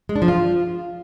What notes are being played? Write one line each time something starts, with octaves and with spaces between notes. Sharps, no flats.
G#3
D4
F3
F4